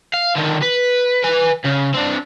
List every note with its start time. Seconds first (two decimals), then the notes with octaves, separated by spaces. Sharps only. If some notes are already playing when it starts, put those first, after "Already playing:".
0.14 F5
0.36 D3 D#3
0.63 B4
1.24 B4 G#5
1.65 C#3
1.95 C4 D4